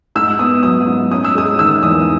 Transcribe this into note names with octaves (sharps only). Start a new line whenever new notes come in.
G#2 E6
B3 D#6
F#3 D#6
G#2
C#4 D#6
E6
G#3 D#6
D#3 E6
E2 D#6